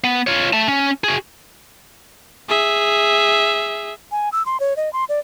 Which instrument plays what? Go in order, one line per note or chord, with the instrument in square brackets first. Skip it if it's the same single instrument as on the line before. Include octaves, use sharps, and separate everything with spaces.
[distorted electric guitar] B3
F4 C#5
A3 A5
C#4
F#4 G#4
[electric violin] G#4 E5
[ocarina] G#5
E6
C6
C#5
D#5
C6
D5